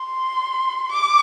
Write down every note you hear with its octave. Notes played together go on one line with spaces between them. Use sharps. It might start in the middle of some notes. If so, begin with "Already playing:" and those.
Already playing: C6
D6